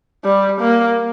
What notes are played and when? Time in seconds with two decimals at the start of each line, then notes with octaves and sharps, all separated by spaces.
0.24 G3
0.60 A#3